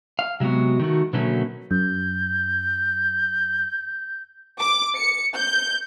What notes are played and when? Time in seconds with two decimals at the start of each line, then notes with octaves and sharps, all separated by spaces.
0.19 F5
0.40 C3 F#3 G#3 B3 F#4
0.79 D#3 A3 F#4
1.13 B2 D3 F#3 A3 A#3 C#4
1.71 F#2 G6
4.60 D6
4.96 C#7
5.36 G6